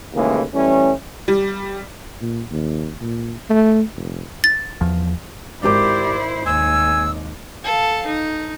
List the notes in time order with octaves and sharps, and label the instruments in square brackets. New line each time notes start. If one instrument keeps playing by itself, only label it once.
[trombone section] D#2 A2 C#3 E3 G#3 A#3
E3 G3 A3 C#4
[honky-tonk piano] G3
[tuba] A#2
D#2
A#2
A3
F1
[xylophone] A6
[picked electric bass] E2 F3
[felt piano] G#1 A#4 D6 [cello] E4 C5 [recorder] G4 [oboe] D5
[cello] D#2 [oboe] G#5 [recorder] E6
[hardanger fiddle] A4 F5
D#4